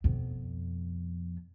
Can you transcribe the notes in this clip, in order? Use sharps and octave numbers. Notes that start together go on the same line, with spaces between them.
F2 B2